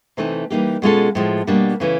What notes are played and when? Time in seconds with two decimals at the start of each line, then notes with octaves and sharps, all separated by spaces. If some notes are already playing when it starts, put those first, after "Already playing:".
0.17 C3 E3 A3 C4 D#4
0.50 E3 G3 A#3 D#4 G4
0.82 B2 G#3 C#4 F4 A4
1.15 A2 F3 G#3
1.47 B2 G3 A#3 D4
1.80 C#3 E3 A3 C#4